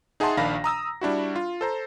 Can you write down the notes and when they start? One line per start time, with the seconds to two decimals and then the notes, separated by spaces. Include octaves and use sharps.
0.20 D#4 G#4 E5 F#5 A5 C6
0.37 A#1 D#3 D4 F5 B5 A#6
0.64 A#5 D#6 E6 A#6
1.01 G3 D4 E4 F#4
1.36 F4
1.61 A4 C5 A#5